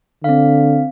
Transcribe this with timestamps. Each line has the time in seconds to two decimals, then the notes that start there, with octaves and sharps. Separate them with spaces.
0.24 D3 C4 F5